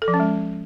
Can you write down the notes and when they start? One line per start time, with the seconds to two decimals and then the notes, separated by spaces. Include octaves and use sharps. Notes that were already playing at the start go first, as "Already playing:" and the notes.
0.02 A4
0.08 F3
0.14 C#4
0.20 G#3